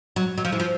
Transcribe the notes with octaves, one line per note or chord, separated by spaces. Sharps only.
F#3
F#3
F3
E3
F3